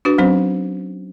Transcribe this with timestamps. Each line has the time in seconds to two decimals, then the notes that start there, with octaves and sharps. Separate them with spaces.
0.05 D4 F#4 B4
0.18 F#3 C4 C#4 C5